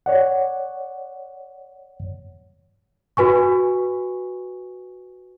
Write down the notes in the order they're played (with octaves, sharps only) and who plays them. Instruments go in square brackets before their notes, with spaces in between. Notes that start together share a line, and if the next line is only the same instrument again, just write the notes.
[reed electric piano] C#5 D5 F#5
[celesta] F#4 B4 G#5 C#6